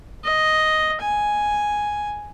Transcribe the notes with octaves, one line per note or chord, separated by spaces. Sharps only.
D#5
G#5